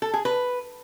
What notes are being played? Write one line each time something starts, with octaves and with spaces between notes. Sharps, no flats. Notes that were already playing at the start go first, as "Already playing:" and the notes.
A4
G#4
B4